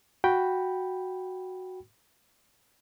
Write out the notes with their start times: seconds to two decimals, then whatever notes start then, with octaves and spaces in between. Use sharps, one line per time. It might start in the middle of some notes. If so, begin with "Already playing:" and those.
0.24 F#4 G5 B5